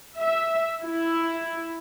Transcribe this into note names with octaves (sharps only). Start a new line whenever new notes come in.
E5
E4